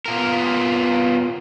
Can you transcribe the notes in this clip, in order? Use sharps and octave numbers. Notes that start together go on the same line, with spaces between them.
B3 F4 A#4